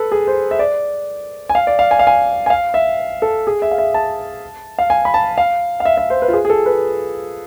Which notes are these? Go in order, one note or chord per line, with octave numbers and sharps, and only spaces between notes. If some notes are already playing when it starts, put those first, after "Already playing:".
Already playing: A4 B4
G#4
C5
E5
D5
G#5
F5
D5
F5
G#5
F5
G#5
G#5
F5
E5
A4
G#4
E5
F5
E5
A5
F5
G#5
B5
A5
F5
F5
E5
E5
C5
B4
F4
G#4
G#4
A4
B4